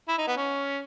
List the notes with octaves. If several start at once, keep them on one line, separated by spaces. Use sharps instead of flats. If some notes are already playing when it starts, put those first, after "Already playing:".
E4
D#4
B3
C#4